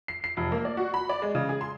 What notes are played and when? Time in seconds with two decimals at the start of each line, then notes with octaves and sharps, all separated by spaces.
0.08 C7
0.24 C7
0.37 F1
0.52 A#3
0.65 D5
0.77 F#4
0.94 B5
1.09 D5
1.22 G#3
1.35 C#3
1.49 G#4
1.61 C6